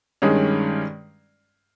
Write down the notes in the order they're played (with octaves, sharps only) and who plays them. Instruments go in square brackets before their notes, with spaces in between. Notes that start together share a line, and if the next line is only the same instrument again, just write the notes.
[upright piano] G2 D#3 G#3 C#4